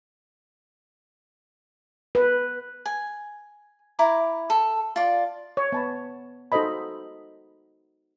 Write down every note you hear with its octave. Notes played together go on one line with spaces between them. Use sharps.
B4
G#5
E4 A#5 D6
A4
F4 D5
C#5
B3 A5 B5
D#4 F#4 A4 C5 D#5 B5